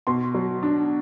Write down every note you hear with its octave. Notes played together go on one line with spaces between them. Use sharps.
B2 C6
F#3
D4